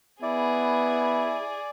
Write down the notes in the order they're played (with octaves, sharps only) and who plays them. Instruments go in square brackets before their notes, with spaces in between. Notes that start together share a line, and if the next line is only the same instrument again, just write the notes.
[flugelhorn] B3 [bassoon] E4 [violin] G#4 [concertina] D5